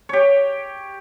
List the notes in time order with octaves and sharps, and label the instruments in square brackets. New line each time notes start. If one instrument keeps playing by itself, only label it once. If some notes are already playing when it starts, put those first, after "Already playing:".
[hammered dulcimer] G4 C#5